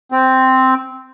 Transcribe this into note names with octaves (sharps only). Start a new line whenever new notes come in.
C4